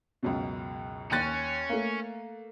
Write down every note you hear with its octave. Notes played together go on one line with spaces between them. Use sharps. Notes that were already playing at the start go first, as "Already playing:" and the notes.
C#2 F#2 B2
D#2 C#4 F#6 A6
A3 A#3